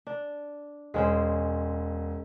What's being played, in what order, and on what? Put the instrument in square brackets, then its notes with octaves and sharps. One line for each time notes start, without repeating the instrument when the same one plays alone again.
[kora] D4
[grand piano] E1 [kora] G#3 C#4 C5